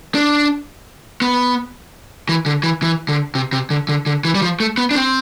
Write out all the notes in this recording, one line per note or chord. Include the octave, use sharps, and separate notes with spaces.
D4
B3
E3
D3
E3
E3
D3
C3
C3
D3
D3
D3
E3
G3
F3
A3
B3
D4
C4